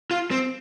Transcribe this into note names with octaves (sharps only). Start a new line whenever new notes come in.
F4
C4